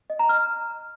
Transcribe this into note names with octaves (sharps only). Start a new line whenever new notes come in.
D#5
A#5
F6